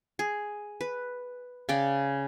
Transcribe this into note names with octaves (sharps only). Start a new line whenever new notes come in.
G#4
B4
C#3 D5 G5